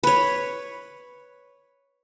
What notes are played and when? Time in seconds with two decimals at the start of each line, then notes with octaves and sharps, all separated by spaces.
0.03 B4 C#5